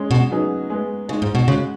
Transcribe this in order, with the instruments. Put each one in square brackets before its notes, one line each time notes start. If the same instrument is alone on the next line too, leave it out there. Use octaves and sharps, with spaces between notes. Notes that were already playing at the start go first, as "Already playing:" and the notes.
Already playing: [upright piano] G#3 C#4 G#4
[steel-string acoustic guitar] B2
[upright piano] C#3 F#3 B3 D#4 G#4
G#3 B3 G#4
[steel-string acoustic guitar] C#3 [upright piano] G#3 D#4 G#4
[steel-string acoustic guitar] G#2
B2
[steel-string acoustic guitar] C#3 [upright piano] G#3 C#4 F#4